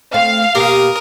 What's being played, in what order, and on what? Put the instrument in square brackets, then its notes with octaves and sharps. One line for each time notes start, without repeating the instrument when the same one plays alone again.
[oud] A3 C4 [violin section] F5
[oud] B2 A#3 G4 [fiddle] A#4 D#6